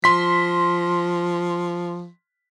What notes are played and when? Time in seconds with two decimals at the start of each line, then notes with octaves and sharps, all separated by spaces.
0.04 F3 C6 B6